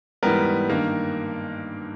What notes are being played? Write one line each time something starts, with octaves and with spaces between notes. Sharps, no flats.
G#2 E3 G3 B3 A#4
G2 D#3 A#3